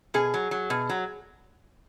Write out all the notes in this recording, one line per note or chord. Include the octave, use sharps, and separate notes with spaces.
B2 G#4
F#3
F#3
B2
F#3